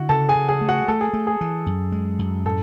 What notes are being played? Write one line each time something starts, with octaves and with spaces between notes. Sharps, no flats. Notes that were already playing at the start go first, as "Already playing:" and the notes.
Already playing: D3 E4 F#4
C#3 A4 A5
G#4 G#5
C#3
G#4 G#5
A3
F#4 F#5
A3 A4
G#4
A3
G#4
E3
F#2
G#3
F#2
A2 A4